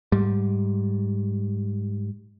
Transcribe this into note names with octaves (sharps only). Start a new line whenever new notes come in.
G#2 G3